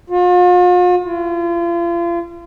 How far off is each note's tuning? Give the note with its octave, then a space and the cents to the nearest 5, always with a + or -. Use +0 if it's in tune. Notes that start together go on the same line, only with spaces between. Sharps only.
F4 +40
F4 -40